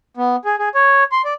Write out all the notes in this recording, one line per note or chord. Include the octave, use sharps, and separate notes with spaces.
B3
G#4
G#4
C#5
C6
D5